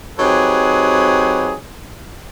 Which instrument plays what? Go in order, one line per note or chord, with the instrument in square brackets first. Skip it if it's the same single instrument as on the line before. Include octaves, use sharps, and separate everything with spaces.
[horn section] F#3 C4 D#4 G4 G#4 B4